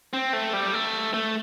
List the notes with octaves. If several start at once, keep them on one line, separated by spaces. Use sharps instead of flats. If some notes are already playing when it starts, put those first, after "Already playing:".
C4
A3
G3
A3
A3